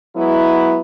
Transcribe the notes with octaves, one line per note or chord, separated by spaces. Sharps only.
F#3 G#3 B3 E4